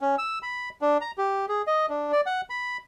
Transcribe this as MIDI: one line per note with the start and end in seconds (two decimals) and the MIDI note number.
0.01 0.16 61
0.18 0.39 88
0.42 0.69 83
0.81 0.98 62
1.01 1.11 82
1.18 1.46 67
1.49 1.62 68
1.67 1.86 75
1.89 2.12 62
2.12 2.21 74
2.26 2.41 78
2.50 2.77 83